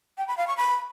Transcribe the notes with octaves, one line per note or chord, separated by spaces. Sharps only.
G5
B5
F5
C#6
B5